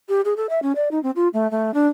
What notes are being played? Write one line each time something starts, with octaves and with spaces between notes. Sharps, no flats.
G4
G#4
A4
E5
C#4
D5
D#4
C4
F4
A3
A3
D4